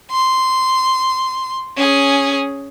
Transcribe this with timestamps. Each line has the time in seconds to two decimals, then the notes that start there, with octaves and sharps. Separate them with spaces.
0.11 C6
1.77 C#4 G#4